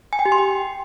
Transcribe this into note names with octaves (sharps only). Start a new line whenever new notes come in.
G#5
G5
G4
C6
G5